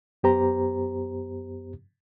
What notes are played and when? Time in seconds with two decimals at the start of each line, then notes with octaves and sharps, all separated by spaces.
0.23 F#2 B3 G4 C5 A#5